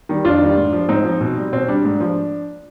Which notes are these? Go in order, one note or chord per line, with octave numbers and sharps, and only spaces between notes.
D#3 G3
F2 D4 F4
D#3 G3
G#2
F3
G#2 C4 D#4
F3
B2
G3
B2 C4
G3 D4
G#2
F3